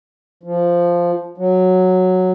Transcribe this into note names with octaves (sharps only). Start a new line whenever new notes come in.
F3
F#3